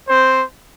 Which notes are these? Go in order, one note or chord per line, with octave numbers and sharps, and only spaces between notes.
C4 C5